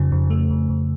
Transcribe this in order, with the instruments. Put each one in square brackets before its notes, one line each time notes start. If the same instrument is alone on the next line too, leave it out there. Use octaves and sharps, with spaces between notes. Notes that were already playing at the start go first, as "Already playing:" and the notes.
Already playing: [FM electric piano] F2 C#3
F2
A3
F2
F2